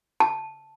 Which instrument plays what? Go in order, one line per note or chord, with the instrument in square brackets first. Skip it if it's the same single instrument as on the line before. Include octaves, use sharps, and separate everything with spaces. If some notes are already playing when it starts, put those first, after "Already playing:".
[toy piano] A5